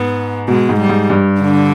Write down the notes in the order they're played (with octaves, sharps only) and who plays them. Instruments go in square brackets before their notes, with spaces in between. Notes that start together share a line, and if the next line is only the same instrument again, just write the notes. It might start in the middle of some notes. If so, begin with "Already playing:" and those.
Already playing: [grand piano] G#2 [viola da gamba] B3
[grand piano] B2 [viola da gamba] G#3
[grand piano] G#2
[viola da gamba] G3
[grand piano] G#2
G2
[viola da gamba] D3